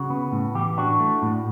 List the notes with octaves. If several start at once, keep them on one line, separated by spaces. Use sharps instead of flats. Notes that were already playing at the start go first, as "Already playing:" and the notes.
Already playing: C#3 F#4
B3
A2
E3 G4
D4 F#4
A3
A2